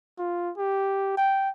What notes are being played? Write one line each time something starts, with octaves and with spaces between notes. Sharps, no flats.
F4
G4
G5